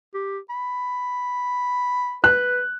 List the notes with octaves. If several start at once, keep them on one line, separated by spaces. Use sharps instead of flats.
G4
B5
B4 F#6